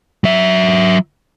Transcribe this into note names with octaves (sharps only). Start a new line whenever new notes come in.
F#3 E5